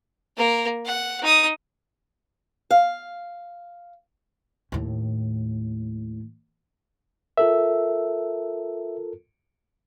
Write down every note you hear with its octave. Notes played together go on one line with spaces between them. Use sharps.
A#3 A#4
F#5
D#4 D#6
F5
D#2 A2
F4 A4 A#4 E5